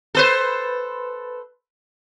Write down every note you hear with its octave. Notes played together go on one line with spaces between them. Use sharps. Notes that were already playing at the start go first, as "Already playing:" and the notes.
A4 B4 C5